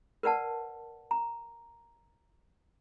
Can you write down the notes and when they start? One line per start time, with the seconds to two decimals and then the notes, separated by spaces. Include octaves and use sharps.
0.23 A#4 B4 D5 F#5 A5
1.11 A#5